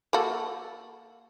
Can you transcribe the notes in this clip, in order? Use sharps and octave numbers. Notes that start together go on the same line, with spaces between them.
A#3 F#4 A4